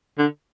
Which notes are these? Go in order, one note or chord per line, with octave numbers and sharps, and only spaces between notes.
D3